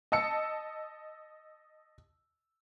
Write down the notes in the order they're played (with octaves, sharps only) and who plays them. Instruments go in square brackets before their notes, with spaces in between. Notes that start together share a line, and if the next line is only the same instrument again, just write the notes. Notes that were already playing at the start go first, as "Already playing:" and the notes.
[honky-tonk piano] D#5 A5 E6 C#7